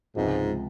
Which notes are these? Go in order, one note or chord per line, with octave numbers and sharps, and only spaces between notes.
C#2 G#2 C3 F3